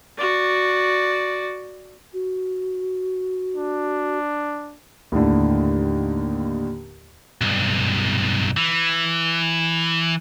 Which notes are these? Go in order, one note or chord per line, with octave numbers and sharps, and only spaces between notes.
F#4 D5
F#4
D4
D#2 A2 D3
B1 G2
E3